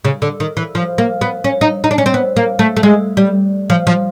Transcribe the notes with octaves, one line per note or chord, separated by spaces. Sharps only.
C#3
D3
D#3
E3
F3
A#3
B3
C#4
D#4
D#4
D4
C#4
C4
B3
A#3
A3
A3
G#3
G3
F3
F3